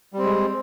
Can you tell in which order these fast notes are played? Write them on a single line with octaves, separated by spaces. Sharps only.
G3 C4 G#3